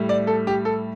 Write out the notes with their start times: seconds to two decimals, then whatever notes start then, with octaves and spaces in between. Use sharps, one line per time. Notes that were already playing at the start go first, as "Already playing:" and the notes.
Already playing: A2 G3
0.09 D5
0.27 A4
0.47 G4
0.65 A4